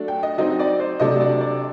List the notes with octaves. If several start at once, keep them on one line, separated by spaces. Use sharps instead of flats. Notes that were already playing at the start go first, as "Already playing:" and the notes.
Already playing: F#3 A3 D4
G5
D#5
F#3 C4 D#4 D#5
D5
C5
C3 F#3 A3 D4 D#5
D5
D5